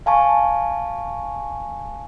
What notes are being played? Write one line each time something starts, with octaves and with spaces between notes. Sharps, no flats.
F5 G#5 A5 C#6